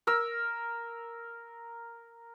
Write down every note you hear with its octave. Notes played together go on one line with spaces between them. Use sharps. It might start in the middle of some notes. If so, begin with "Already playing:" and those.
A#4 E6